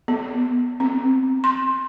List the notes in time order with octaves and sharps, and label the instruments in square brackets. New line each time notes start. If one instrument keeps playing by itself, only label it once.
[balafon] B3
C4
C6